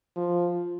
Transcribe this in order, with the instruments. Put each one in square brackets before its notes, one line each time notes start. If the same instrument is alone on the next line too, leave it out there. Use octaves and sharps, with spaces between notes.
[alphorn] F3